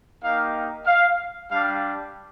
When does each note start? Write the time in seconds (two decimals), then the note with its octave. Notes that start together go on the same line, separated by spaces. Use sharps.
0.22 A#3 D#4 G4 F5
0.86 F5
1.50 G3 D4 G4 F5